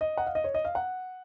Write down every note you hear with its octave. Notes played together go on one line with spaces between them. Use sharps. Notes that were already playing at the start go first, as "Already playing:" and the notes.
D#5
F#5
F5
D#5
C#5
D#5
F5
F#5